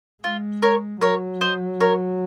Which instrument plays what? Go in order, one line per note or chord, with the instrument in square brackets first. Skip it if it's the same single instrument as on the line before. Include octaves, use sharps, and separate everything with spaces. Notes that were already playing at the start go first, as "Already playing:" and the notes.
[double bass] G#3 [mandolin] F4
[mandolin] A#4 C#5
[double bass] F#3 [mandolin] A#4 C#5
[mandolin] C5 D#5
A#4 C#5